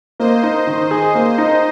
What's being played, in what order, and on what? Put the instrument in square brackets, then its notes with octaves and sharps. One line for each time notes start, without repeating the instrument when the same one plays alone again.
[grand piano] A#3 [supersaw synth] C5 D#5
[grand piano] D#4
D#3
G#4
A#3
D#4